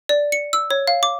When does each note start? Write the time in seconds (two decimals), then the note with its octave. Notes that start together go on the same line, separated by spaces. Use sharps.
0.09 D5
0.32 C#7
0.53 E6
0.71 C#5
0.88 F5
1.03 D6